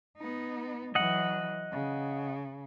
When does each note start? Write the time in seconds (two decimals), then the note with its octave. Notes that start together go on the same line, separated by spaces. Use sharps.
0.18 B3 D#4
0.95 E3 F#3 D#5 F#5
1.72 C#3